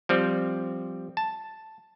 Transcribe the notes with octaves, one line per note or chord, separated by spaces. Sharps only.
F3 G3 C4
A5